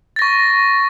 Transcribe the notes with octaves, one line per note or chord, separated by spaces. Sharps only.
C#6 A6 A#6